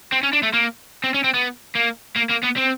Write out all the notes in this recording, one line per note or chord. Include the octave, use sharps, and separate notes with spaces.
C4
C#4
D4
A3
A#3
C4
C#4
C4
B3
A#3
A#3
A#3
B3
C4